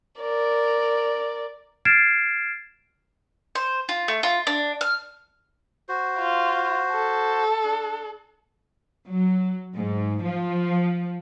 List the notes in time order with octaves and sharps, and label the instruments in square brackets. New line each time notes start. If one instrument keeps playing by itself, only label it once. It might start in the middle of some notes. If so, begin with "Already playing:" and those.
[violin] A#4 D5
[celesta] F6 G#6 A6 C7 D7 E7
[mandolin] C5
F4
A3
F4
D4
F6
[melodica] F#4 C5
[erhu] F4
A4
[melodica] D4
[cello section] F#3
G#2
F3